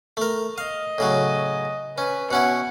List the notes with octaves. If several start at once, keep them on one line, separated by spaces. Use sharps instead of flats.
A3 A#4
D#5 F5
A2 C#3 F#3
C#4 B4
B2 C#4 E4 F#5